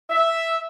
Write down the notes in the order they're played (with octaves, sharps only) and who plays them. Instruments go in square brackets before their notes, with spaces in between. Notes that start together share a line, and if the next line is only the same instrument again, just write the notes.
[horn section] E5